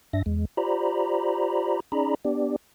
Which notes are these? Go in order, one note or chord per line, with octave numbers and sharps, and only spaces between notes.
G2 D4 E5 A#6
E2 G#3
F4 G4 C5 D5 A#5 B5
C#4 D#4 G#4 D5 A#5 B5
B3 D4 G4 D5